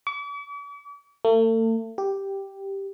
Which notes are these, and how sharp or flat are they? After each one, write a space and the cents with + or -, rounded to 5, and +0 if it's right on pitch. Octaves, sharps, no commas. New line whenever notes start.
D6 -45
A3 +40
G4 +0